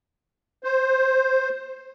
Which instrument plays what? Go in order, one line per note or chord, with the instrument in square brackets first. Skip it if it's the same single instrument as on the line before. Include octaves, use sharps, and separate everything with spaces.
[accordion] C5